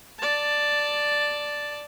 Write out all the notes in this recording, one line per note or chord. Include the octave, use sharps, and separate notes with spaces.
D5 A5